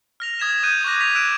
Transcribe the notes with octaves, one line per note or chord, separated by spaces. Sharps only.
F6 A#6 F7
D#6 G#6 B6 E7
D#6 F#6 G6 D#7
C#6 D6 F#6 A#6
F#6 B6 F7
E6 F#6 D7 E7